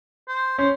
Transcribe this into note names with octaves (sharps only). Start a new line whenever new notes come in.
C5
C#4 C5